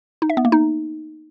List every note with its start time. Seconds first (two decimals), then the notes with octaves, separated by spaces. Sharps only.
0.22 D#4
0.30 E5
0.37 B3
0.45 A#3
0.52 D#4